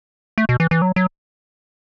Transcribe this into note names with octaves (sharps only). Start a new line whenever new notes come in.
A3
B2
E3
E3
F#3
F#3